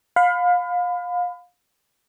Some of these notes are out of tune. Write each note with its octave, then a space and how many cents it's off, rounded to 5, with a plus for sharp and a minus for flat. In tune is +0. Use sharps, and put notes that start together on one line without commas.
F5 +30 B5 +30